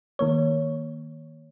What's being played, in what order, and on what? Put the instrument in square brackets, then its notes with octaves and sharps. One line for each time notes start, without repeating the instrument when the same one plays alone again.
[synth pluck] D#3 A#3 C#5